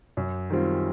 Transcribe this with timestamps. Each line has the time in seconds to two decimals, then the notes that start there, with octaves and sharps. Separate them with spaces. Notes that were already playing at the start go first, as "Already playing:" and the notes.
0.17 F#2
0.50 D#3 G3 C4 F4